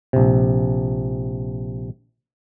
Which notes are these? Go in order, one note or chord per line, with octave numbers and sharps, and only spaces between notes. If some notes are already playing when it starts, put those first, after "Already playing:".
A#1 C3